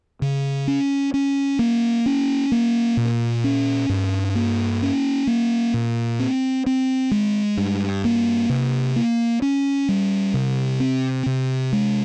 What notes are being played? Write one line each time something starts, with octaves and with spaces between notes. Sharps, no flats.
C#3
C#4
C#4
A#3
C#4
A#3
A#2
C#4
G2
A#3
C#4
A#3
A#2
C4
C4
G#3
G2
A#3
C3
A#3
C#4
G3
C3
C4
C3
G#3